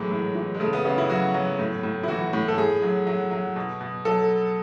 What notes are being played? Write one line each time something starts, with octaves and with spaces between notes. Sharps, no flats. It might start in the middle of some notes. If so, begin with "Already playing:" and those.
Already playing: A2 E3 F#3 G#3
A2
E3
G#3
C#3 A3
B3
C#3 C#4
E4
F#3 F#4
F#3
A2
A2
E4
E3 F#4
A2
A4
A2 G#4
F#3
F#3
F#3
B2
B2
F#3 A4